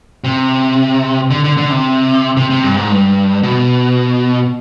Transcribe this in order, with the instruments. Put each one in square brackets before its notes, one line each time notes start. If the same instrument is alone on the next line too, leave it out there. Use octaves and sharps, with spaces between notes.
[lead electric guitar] C3
D3
D3
D3
C3
C3
C3
G2
G#2
G2
B2